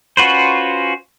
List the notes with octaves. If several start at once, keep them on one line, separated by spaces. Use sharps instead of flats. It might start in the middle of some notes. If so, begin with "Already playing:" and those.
C#4 F4 F#4 B4 C5